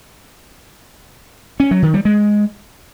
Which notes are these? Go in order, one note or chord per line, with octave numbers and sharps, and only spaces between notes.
C#4
F#3
D#3
G3
G#3